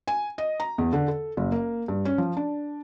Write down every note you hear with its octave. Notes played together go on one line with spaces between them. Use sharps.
G#5
D#5
A#5
E2
D3
A4
F#1
A#3
G2
C#4
F3
D4